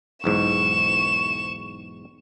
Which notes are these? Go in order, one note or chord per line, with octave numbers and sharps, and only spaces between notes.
B1 E2 G#2 C#6 E7